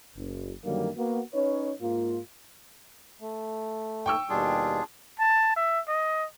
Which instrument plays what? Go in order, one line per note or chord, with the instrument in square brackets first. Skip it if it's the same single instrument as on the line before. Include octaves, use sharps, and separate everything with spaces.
[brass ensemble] F#1
F#2 D3 D#3 F#3 G3 A#3
A#3 B3 F#4
C#4 D#4 B4 C#5
G#2 A#3 F4
[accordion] A3
[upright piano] G5 C#6 E6
[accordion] D#2 B2 G3 [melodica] D4 F4 G#4
[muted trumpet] A5
E5
D#5